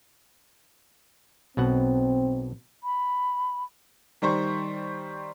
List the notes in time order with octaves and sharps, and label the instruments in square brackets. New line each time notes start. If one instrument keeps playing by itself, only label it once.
[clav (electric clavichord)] B1 B2 F#5 [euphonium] C4
[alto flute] B5
[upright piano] D#3 G3 C5 C#6